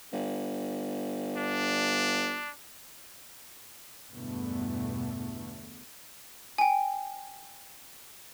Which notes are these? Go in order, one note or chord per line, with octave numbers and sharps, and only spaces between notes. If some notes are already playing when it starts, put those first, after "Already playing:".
G1
D4
E2 G2 B2 D3 A3 B3
G5 G#5